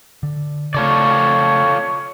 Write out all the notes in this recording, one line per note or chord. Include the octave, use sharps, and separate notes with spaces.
D3
C#3 A3 F4 A4 C#5 D5